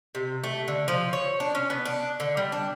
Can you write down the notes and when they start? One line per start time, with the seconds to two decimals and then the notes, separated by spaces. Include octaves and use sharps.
0.15 C3
0.44 A3
0.68 D3
0.88 F3
1.13 C#5
1.40 D4
1.55 C#4
1.70 B3
1.85 D4
2.20 D3
2.37 G3
2.52 D4